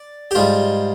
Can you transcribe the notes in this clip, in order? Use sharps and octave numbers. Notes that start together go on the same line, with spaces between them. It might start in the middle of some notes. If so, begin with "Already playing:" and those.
Already playing: D5
G4
G#2 G3 F4